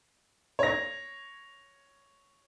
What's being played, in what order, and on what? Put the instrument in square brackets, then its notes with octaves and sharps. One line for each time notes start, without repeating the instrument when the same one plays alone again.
[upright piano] C#5 A#6